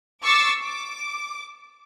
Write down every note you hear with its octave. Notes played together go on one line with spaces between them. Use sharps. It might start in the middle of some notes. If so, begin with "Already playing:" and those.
C#6 D6 E6 A6 C7
D6